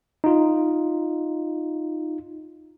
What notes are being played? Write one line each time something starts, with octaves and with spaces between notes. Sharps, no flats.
D#4 F4